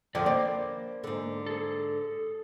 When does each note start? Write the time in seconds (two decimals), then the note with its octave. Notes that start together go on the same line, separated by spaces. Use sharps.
0.15 F2 D3 D#3 F3 A4 D5
0.26 A#3 A#4 C5 D5
1.04 G#2 D3
1.46 G#4 A4